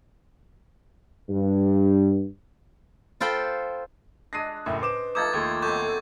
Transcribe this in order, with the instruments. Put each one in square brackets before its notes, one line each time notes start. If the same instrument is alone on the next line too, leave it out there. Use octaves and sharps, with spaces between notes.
[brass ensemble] G2
[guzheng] F4 A4 C5 G5 B5
[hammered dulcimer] G#3 D4 [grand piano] A#6 C7 D#7
[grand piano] F#1 A2 [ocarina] E5
[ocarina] B4 [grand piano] C5 D6 E7
[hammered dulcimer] F3 A3 D#4 [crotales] D6 G#6 A6
[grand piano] D#2 A3 [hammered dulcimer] C#5 C6
[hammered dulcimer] B2 F#3 C4 [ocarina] A4 [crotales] C#6 D6 G6